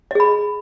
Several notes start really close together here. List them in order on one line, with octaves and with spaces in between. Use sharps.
D#5 G#4 B5